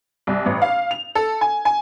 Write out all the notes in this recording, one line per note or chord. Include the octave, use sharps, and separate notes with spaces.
C2
A1
F5
F7
A4
G#5
G#5